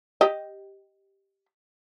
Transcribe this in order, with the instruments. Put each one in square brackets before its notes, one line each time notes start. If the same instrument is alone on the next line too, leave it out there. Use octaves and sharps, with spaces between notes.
[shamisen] G4 D#5